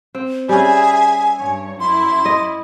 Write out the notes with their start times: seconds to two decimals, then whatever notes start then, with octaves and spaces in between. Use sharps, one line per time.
0.15 C4
0.49 G3 C#4 G#4 E5 G#5
1.37 G2 C#5
1.80 F#2 E4 C6
2.25 D#5